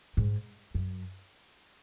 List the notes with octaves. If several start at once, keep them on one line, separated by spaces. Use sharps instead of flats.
G#2
F#2